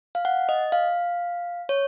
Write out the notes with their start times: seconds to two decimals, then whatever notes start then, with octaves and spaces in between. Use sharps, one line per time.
0.15 F5
0.25 F#5
0.49 D#5
0.72 F5
1.69 C#5